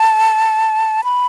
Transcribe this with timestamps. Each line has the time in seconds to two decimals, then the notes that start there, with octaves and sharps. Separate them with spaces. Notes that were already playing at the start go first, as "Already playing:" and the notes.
Already playing: A5
1.04 B5